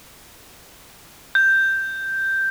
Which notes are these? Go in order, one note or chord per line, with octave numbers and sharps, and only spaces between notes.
G6